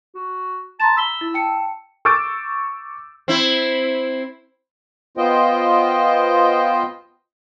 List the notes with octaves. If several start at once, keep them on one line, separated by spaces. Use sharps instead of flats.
F#4
A5 A#5 C6 E7
B5 E6 B6 G7
E4
G5 A5 C#7
C#6 D6 E6 G6 A6 D7
C4 E4
B3 F4 C5 D#5 G5